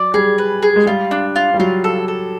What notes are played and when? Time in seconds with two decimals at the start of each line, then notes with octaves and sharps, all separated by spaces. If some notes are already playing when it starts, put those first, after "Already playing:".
Already playing: F#3 D5
0.14 G3 G#4
0.38 B4
0.62 G#4
0.76 G#3
0.86 G3 F4
1.11 D4
1.36 F4
1.54 G3
1.59 F#3 F4
1.84 A4
2.08 A4